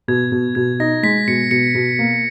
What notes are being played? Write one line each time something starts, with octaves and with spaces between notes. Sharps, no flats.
B2 G#6
B2
B2 G#6
D#4 A#6
G#3 B6
B2 C#7
B2 C#7
B2
A#3